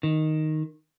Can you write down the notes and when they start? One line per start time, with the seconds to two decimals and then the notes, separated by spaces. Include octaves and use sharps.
0.03 D#3